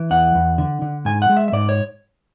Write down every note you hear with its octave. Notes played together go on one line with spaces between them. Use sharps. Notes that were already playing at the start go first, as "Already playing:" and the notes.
Already playing: E3
E2 F#5
E2
D3
D3
G#2 G#5
F#5
G#3
E5
E5
G#2 D5
C#5